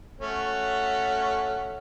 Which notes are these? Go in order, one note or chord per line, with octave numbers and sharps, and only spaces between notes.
A3 C#4 F#4